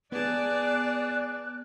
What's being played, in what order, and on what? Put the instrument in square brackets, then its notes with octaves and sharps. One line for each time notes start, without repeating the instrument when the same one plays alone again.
[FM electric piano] B3 [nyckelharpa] G#4 A5 [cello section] D5 [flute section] F#6